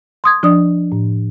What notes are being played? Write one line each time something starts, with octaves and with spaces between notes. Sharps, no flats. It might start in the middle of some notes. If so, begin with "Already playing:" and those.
C6 D#6 G#6
F3 D4 D5 D#6
A2